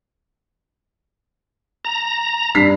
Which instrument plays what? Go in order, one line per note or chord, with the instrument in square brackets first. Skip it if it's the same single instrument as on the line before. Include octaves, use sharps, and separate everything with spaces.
[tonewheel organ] A#5
[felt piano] G2 B6 C7